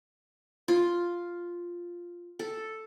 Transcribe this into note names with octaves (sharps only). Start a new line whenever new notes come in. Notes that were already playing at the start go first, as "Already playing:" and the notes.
F4
A4